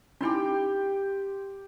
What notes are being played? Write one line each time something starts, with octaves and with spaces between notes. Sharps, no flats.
C#4 D#4 E4 G4 G5 C6